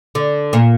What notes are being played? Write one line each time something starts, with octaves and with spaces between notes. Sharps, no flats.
D3
A#2